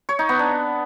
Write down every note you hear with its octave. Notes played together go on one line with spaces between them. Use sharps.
C#5
D#4
B3
D4